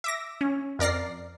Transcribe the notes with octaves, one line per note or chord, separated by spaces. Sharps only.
E5 D6 A#6
C#4
F2 A#4 D5 A#6 C7